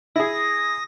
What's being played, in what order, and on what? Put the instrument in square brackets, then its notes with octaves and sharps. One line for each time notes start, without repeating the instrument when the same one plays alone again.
[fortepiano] E4 G#4 [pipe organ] D#6 A#6